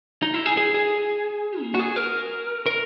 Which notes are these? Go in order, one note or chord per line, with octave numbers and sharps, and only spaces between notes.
D#4
E4
G#4
G#4
G#4
A#3
F#4
G#4
A#4
A#4